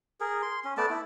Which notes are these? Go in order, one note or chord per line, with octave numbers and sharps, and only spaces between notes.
G#4 A#4
C6
C#4
A3 B3 D5 A5
E4